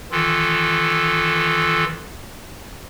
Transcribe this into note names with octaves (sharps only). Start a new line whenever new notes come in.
D#3 E3 F4 A4